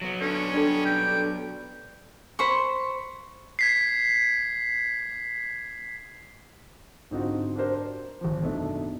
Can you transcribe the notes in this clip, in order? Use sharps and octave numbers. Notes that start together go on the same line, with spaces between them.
F#3 B3
D3 C#4
G3 D4 A4
G5
C5 B5 C#6
G#6 B6 C7
G#2 D3 C4 D#4 F4 F#4
D4 F#4 G4 A#4 C5 D5
C5
G#1 F3
F#1 B2 A3 D4 D#4 E5